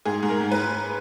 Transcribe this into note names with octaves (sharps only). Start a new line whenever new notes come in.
G#2 G#4
G#2
A#4
G#2
B4